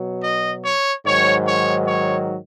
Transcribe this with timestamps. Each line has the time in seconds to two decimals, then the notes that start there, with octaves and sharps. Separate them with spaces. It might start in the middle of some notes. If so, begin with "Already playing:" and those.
Already playing: B2 F#3
0.24 D#5
0.65 C#5
1.06 G#2 D#3 F#3 C#5
1.47 C#5
1.88 C#5